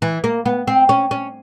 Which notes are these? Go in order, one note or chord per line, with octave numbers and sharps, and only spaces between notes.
E3
A#3
B3
C4
C#4
C#4